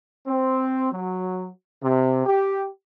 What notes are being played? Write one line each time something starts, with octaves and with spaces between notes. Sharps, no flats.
C4
F#3
C3
G4